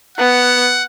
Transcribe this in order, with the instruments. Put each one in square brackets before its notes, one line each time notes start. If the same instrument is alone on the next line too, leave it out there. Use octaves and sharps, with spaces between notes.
[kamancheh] B3 [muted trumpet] F#5